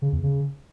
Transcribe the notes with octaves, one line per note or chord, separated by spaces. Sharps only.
C#3
E2
C#3